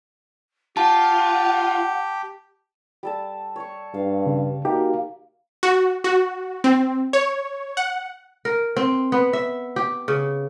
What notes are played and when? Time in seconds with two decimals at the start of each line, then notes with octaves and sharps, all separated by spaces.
0.77 F4 G4 F#5 A5
3.03 G3 A4 A5
3.56 C#5 C#6
3.94 G2 F5
4.26 C#3
4.65 A#3 D#4 F#4 G4
5.63 F#4
6.04 F#4
6.64 C4
7.13 C#5
7.77 F#5
8.45 A#4
8.77 C4
9.12 B3
9.33 E5
9.76 G4
10.08 C#3